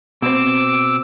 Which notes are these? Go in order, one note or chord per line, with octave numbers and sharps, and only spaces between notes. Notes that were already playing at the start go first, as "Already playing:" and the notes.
B2 C4 D6 E6